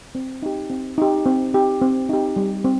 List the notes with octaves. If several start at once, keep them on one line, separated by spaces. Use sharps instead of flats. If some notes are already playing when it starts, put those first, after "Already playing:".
C4
D#4 G4
C4
D#4 G4
C4
D#4 G4
C4
D#4 G4
G3
C4